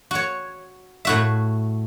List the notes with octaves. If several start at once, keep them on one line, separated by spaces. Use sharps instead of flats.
F#4 C#5
A2 F#4 E5